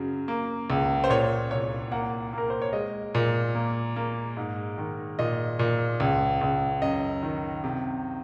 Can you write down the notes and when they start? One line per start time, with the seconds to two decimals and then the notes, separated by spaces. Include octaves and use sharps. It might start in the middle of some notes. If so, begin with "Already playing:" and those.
Already playing: F#2 C#3 F#3
0.28 A#3
0.70 C#2
1.04 C5
1.10 A#2 C#5
1.51 C2 C#5
1.92 A#3 F#5
2.33 A#3 A#4
2.50 C5
2.62 C#5
2.73 G#3 D#5
3.15 A#2
3.55 A#3
3.96 A#3
4.37 G#2
4.78 D#3
5.19 A#2 D#5
5.59 A#2
6.00 C#2
6.41 C#2
6.82 F#2 D#5
7.23 D#3
7.64 C3